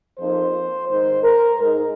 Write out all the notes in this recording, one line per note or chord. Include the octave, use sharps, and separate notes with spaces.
F2 F3 A#3 D#4 C5
G#2 D#3 G#3 D#4 C5
A#4
G#2 G#3 D#4